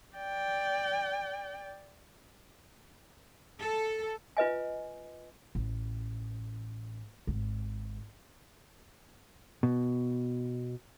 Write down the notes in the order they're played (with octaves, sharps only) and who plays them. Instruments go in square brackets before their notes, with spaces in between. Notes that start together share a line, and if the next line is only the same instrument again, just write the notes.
[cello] D5 G5
[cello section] A4
[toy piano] F4 B4 D#5 G#5
[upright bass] A1
G#1
[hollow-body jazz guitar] B2